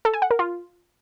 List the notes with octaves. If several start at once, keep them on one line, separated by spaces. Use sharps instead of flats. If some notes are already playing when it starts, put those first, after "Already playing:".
A4
G#5
F#5
A#4
F4